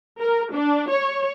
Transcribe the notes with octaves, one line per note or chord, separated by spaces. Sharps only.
A#4
D4
C#5